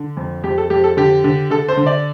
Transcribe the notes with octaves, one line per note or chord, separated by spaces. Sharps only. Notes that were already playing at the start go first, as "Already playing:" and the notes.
Already playing: D3
F2
F2 G4
A4
F2 G4
A4
D3 G4
D3
D3 A4
C5
D3
D5